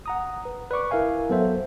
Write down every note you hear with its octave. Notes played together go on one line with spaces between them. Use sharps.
F#5 A#5 D#6
B4
B4 D5 C#6 D6
E4 A#4 E5 F5 G#5
F#3 B3 A4 C5 E5